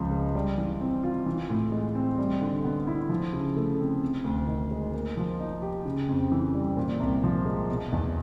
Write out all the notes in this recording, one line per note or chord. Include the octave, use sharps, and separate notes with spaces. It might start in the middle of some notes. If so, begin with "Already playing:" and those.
Already playing: C#2 C#3 F3
G#3
G3
E3
C4
F4
E3
A2
G#3
C4
G3
D3
B3
E4
F3
C#3
A3
C4
C3
D2
D#3
G#3
A#3
F3
D#4
G4
C#3
F2
E3
G3
A#2
C2
F3
G#3
B2
E2